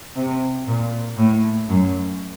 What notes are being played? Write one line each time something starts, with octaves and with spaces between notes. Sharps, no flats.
C3
A#2
A2
F#2